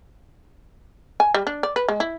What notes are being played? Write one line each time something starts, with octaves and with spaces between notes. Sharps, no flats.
G#5
G3
D4
D5
B4
G#3
E4